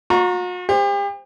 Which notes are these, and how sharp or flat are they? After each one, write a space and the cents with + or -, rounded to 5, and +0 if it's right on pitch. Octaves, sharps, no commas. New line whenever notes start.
F#4 -45 A#5 +0 C#6 +0
G4 +40 C5 +0